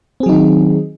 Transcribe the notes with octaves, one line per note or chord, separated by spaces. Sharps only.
D#3 F#3 C4 D#4 G#4